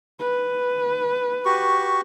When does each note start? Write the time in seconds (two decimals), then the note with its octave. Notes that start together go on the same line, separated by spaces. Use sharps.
0.19 B4
1.45 F#4 G4 C#6